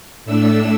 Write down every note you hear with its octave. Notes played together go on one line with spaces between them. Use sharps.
A2 A3 D4 E6